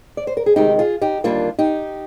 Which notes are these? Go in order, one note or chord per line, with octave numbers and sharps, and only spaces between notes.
D5
C5
A#4
G#4
D2 C3 D#3 G#3 D#4 G4
F4 G#4
D#4 G4
D#2 D3 G3 A#3 D4 F4
D#4 G4